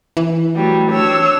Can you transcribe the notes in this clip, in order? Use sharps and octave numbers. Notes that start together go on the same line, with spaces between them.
E3
F#3 G3 A3
D4 C#5 E6